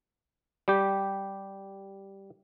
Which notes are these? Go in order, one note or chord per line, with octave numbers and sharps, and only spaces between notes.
G3 G4